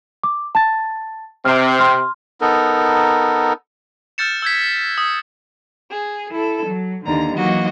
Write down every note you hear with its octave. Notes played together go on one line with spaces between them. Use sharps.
D6
A5 A6
C3 C4 F6
C6 F6
B3 D#4 A4 A#4
E6 F6 G6 A6 C#7 E7
E6 G6 G#6 B6
D#6
G#4
E4 A4
F#3
D#2 D3 A#5
E3 F#3 A#3 D#4 F#4 D#5